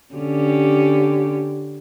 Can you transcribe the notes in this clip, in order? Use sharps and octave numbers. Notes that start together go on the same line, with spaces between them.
D3 C#4 G4